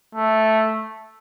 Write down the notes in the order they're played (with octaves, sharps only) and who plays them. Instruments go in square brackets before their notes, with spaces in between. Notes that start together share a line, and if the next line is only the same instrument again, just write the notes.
[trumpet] A3